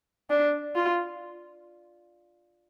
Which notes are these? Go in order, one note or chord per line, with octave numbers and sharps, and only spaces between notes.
D4
F4